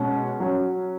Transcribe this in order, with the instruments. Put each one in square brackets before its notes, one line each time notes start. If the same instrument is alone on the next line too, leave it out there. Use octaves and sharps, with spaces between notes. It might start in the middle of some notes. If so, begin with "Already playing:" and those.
Already playing: [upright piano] B2 G#3 C#4
F#3 C#4